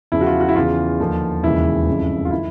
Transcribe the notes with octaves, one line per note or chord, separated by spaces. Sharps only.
E2 C#3 F3 E4
F#4
F4
F#4
E4
E2 C#3 E3 F4
D#2 D3 F3
E1 D#2 C#3 E3 E4
G1 F2 C#3 F3
F4
D#3 E4